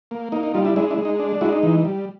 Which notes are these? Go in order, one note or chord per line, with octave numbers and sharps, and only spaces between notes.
A#3
A#3 D#4
D#4
G3 D#4 F4
D4 E4
G#3 D4 E4
D4 E4
G#3
D#4
D4
G#3 E4 F#4
D#4
E3
G3